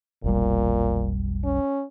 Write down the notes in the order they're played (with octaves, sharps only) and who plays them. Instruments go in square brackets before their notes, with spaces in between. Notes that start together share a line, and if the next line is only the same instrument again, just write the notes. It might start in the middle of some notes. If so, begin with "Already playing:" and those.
[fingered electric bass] F1 B1 G3 [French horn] A#2
[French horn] C#4